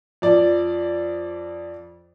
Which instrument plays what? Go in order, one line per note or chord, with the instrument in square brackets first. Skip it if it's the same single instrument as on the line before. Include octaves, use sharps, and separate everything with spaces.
[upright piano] F2 D5